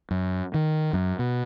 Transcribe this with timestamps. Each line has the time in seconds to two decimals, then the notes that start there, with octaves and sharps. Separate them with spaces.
0.11 F#2
0.54 D#3
0.93 F#2
1.19 B2